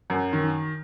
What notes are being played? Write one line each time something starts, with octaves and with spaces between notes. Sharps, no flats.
F#2
D#3